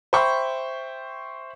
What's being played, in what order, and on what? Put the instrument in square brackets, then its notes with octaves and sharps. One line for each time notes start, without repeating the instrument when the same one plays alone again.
[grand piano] C5 E5 G5 B5 C#6